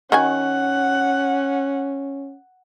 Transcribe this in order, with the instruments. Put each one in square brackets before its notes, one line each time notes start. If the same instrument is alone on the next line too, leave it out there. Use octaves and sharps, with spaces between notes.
[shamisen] D#3 F#4 G#5 [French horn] C#4 [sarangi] F#5